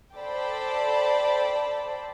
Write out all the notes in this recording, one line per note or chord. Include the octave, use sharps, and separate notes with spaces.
A4 C5 D5 G5 A5 B5